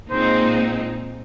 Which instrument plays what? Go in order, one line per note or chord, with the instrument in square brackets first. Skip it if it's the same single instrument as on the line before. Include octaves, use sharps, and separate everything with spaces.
[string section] A#2 G#3 C4 D#4 [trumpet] C5